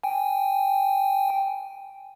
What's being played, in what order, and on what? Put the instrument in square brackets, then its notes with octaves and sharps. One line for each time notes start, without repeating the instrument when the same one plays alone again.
[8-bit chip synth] G5 G#5